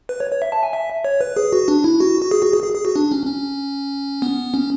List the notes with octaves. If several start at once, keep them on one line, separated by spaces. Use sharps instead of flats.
B4
C#5
C#5
E5
A5
G#5
E5
C#5
B4
G#4
F#4
D4
E4
F#4
F#4
G#4
F#4
G#4
G#4
G#4
F#4
D4
C#4
C#4
B3
C#4